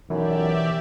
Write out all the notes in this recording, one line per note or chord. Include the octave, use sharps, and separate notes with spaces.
B1 F#2 E3 G4 D5 E5